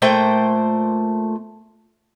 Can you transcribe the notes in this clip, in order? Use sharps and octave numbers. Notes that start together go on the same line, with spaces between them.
A#2 A3 C5 G5